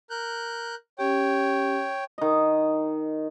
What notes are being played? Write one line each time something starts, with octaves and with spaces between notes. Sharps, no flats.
A#4 F#6 G6
C#4 G4 C#5 G5
D#3 D#5